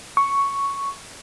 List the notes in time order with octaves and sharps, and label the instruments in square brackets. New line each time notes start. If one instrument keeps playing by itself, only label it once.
[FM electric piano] C#6